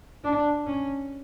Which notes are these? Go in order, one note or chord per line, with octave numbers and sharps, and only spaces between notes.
D4
C#4